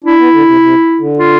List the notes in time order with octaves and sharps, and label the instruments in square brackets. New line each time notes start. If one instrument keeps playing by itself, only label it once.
[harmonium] D4 [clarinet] E4
[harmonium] B3
D3
C3
C3
D3
[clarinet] F4